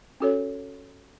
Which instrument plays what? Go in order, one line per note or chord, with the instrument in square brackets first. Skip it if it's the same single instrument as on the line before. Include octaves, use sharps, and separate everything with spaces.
[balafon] C#4 F#4 A4 C#5